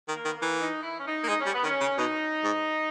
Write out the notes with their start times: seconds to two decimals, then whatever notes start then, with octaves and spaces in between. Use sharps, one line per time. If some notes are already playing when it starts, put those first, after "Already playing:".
0.08 D#3
0.14 A#3
0.25 D#3 B3
0.37 A#3
0.42 E3
0.60 D#4
0.83 E4
0.99 C#4
1.06 D#4
1.24 A#3
1.29 G#3 D#4
1.40 C#4
1.46 G3
1.53 B3
1.63 D#3 C#4
1.81 C#3
1.98 B2 D#4
2.44 G#2